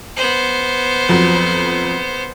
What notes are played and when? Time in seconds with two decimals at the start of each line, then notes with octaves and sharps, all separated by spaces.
0.16 B3 C5
1.09 F2 F3 F#3